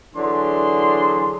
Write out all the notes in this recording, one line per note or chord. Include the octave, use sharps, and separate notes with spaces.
D3 E3 F#3 D4 G#4 C6